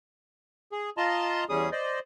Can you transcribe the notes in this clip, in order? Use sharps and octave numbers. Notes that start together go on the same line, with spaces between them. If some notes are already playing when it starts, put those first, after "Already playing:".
G#4
F4 D#5 A5 A#5 C6
E2 G3 C#4 G#4 D#6
C5 D5 D#5